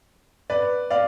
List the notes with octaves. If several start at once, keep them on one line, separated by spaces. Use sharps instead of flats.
B4 D5
D5 F5